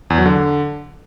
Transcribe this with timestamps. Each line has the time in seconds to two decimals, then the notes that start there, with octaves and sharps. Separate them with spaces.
0.10 E2
0.18 F#3
0.26 D3